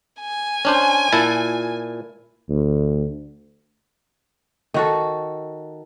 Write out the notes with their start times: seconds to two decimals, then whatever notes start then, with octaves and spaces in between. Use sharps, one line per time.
0.21 G#5
0.65 C#4 D4 C5
1.12 A#2 E4 A5
2.49 D2
4.74 D#3 F#4 A4